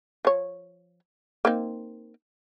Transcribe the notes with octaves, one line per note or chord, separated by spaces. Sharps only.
F3 C#5
A#3 C4 D#4